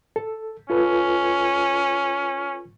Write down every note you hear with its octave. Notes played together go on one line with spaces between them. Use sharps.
A4
C#4 F4 A4 B4